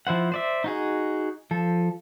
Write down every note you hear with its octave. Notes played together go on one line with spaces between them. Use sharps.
F3 E4 C5 F#5
C5 D5 E5
D#4 F#4 G#4
F3 A4